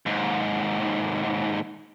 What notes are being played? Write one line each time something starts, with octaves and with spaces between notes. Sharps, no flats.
D#2 G#2